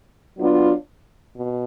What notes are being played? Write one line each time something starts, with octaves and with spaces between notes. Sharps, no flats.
F#3 B3 D4 F4
B2